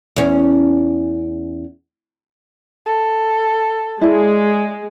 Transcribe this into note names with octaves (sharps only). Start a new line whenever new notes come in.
E2 C#4
A4
G#3 E4 D5